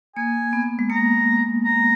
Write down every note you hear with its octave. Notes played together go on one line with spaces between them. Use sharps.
A#3 G#5
B3
G#3
A#3 A#5
A#5